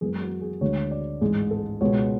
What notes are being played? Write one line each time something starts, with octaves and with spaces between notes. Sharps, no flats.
F#2 E3 G#3 B3 G#4
F#4
G#4
D2 D3 G#3 C#5
D5
A1 G#2 G#3 G#4
A4
C#2 B2 G#3 B3 C#5